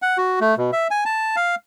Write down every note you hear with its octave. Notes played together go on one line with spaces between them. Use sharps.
F#5
F#4
A3
B2
E5
G#5
A5
F5